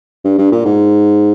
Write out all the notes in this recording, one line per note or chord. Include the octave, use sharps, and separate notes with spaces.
G2
G2
A#2
G#2